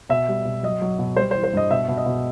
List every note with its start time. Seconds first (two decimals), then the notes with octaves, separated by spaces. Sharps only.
0.09 B2 E5
0.28 G3
0.45 B2
0.63 F#3 D#5
0.82 F#3
0.99 B2
1.17 G3 C5
1.31 C5
1.35 E3
1.44 C5
1.53 G2 D#5
1.71 B2 E5
1.88 B2
1.97 D#5
2.06 B2